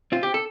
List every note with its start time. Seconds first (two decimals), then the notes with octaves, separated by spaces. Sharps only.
0.12 C4 F4
0.23 G4
0.34 A4